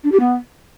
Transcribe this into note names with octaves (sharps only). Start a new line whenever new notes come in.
D4
G4
B3